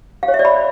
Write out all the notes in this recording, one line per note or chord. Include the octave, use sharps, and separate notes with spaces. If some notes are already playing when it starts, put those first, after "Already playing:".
F5
C#5
E5
D5
B5